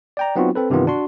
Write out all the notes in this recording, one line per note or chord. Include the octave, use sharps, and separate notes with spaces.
D5 G5 A#5
F#3 B3 C4 D#4 F4 F#4
C4 A4 B4
G2 C3 D#3 E3 B3 F4
D4 F#4 C6